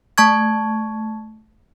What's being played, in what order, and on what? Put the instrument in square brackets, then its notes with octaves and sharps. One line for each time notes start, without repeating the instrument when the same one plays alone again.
[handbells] A3 A5 C#6 G#6